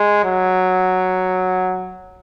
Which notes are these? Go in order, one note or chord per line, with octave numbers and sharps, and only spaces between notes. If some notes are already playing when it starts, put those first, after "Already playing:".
Already playing: G#3
F#3